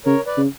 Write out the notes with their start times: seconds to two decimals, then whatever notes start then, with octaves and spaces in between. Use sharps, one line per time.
0.06 C#3 A#4 C#5
0.26 B4 D5
0.37 C#3